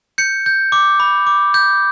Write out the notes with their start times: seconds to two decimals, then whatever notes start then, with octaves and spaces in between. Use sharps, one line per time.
0.18 G6 C#7
0.46 G6
0.72 D6
1.00 B5
1.27 D6
1.54 G6